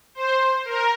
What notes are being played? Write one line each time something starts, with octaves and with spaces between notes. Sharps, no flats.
C5
A#4